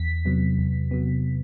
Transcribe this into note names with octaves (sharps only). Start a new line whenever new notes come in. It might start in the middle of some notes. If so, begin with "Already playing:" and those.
Already playing: E2 B6
C3 F#3 B3
E2
C3 F#3 B3